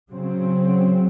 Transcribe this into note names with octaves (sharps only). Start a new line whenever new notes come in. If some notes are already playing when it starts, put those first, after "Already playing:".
C#3 F#3 C4